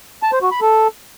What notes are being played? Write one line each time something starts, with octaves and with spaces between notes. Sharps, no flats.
A5
C5
F#4
B5
A4